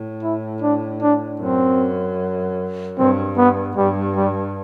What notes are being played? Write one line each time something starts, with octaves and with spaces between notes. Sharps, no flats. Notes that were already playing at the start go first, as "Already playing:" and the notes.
Already playing: A2
E4
D4
D4
F#2 C4
G2 C4
B3
G2 G3
G3